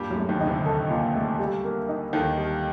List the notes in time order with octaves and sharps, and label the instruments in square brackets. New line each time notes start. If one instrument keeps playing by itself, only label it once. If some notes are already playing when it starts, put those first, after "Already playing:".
Already playing: [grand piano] G2 G3 [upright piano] A#2
[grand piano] F#2 F#3
[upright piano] A3
[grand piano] D#2 D#3
[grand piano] C3 [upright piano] D#4
[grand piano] D2 D3
[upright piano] A4
A#2
A3
G3
A#3
D#4
[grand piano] D#2 D#3 [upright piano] A4
[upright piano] G3